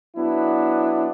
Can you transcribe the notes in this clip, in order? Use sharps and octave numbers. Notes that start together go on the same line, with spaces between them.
F#3 B3 D4 E4